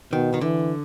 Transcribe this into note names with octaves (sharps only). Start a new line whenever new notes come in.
B2 D#3
D#3
D3 E3